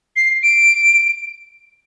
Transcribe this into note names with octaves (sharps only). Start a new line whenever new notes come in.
C7
D7